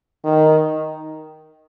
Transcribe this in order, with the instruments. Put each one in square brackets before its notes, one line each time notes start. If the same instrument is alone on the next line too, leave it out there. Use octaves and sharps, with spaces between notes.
[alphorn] D#3